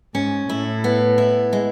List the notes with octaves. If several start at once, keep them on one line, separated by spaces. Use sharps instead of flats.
G#2 C#4
A2 E4
B3
E4
G#3